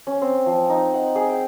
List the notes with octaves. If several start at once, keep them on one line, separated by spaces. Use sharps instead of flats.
C#4
C4
F3
D#4
F#5
G#4
G5